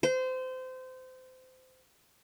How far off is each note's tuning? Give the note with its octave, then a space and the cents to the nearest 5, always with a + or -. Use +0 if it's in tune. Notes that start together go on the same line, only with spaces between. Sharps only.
C5 -25